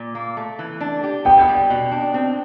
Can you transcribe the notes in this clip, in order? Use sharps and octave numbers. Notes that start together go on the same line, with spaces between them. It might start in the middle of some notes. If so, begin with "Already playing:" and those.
Already playing: A#2
A#3
A3
E3
D4
G4
B3 G5
G3
B2
D4
C4